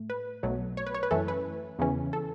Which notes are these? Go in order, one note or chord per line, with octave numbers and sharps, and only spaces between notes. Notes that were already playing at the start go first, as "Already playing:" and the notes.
Already playing: A2 A3
B4
B1 B2 F#3 A3
C#5
B4
C#5
B4
F#2 E3 A3 C#4 A4
B4
E2 C#3 E3 C#4
A4